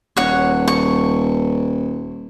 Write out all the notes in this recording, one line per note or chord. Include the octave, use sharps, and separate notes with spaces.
D#1 C#5 F#5
C#6